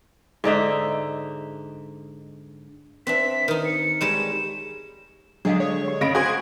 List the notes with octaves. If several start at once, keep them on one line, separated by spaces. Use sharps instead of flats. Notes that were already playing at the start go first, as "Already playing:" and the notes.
G#2 D3 D#4 E5
C4 D4 E5 B6
D#3 D#4
C#7
G3 G#3 C#5 E7
D3 F#3 G#3 D4 G#4 D#5 F5
C#5
G4
C#3 D#5 F5 B5 A#6 D7
F#4 G#4 C5 F5 G#6